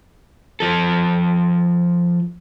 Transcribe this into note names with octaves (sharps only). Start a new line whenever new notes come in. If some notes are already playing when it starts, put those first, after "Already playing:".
F3 A4